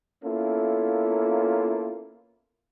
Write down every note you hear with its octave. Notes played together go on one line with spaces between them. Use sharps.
A#3 B3 C#4 E4 F4 A4